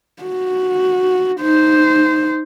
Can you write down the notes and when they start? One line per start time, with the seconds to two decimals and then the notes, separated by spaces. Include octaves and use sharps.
0.23 F#4
1.41 D#4 C5